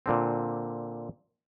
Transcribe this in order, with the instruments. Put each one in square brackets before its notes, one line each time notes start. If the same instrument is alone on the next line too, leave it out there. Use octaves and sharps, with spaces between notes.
[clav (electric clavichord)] A#2 D3 C4